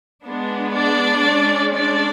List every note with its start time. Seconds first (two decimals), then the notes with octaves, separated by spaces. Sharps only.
0.25 G#3 B3 D4
0.75 D4 D5
1.25 G#3 C#4
1.75 D4 D5